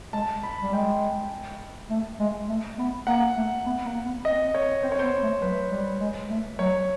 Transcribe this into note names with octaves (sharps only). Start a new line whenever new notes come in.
G#3 A5
B5
G3
G#3 G5
A3
G#3
A3
B3
A#3 F#5
A3
B3
A#3
B3
C4 D#5
C#5
C4 C5
C#5
B3 C5
A3
F#3 B4
G3
G#3
A3
F#3 C#5